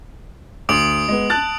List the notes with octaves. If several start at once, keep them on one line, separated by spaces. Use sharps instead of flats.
D2 D#6 D7 F#7
G#3 B3
A5 F#6 A6